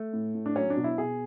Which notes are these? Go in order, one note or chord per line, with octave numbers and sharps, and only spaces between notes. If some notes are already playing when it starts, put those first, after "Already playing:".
Already playing: A3
A2
A2
D4
F#3 C#4
D4
B2
E4
B2 G#4